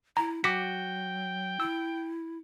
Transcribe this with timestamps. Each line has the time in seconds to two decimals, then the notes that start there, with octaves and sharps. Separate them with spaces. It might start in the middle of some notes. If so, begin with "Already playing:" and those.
0.17 E4 A#5
0.44 F#3 F#4 G5 D6 B6
1.60 E4 E6